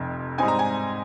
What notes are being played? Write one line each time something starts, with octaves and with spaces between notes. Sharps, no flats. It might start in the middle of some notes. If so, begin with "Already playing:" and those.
Already playing: F1 F2 C3
G#2 G3 C4 D#4 G#5
A#5
G#5